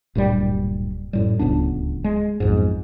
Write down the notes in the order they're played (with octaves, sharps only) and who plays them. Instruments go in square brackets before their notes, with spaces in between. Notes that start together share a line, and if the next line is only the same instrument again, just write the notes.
[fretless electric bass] D1 G2 A#2 G3
F#2 A2 G3
D1 C#2 B3 D4
G#3
B1 F2 G#2